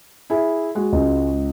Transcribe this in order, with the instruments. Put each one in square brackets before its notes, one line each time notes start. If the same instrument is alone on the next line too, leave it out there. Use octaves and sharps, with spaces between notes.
[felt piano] E4 G#4
G#3 F#4
[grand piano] C#2